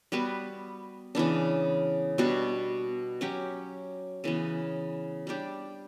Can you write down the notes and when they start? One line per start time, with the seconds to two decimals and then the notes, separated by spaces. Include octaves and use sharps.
0.12 G3 B3 F#4 B4
1.15 C#3 E3 B3 D4
2.18 B2 G3 D4 F#4
3.21 F#3 C#4 G4
4.24 C#3 E3 B3
5.27 G3 D4 G4